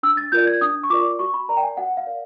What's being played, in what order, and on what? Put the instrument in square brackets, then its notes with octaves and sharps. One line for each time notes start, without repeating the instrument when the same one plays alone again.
[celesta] D4 E6
A6
F4 A#4 D5 G6
G#6
D4 D#6
C#6
F4 A#4 D5 D6
F#4 C#6
B5
A#4 D5 A#5
G5
G#5
F#4 F#5
F5
A#4 D5